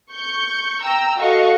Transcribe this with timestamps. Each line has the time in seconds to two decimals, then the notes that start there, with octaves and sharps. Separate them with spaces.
0.12 C#6 G6
0.83 G5 A#5 E6
1.17 F#4 A4 D#5 F5 C#6